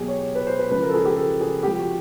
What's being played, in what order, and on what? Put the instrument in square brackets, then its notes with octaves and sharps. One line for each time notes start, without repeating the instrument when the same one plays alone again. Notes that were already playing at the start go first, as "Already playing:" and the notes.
Already playing: [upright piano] B2 F#3 G4 G#4
C#5
B4
C5
B4
C#3 B4
F3
A#4
A4
G#4
G4
A4
G#4
C3 F3 G4
F#4